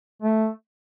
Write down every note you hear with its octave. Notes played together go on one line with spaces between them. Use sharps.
A3